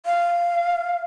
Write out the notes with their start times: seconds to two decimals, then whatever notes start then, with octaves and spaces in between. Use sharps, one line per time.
0.06 F5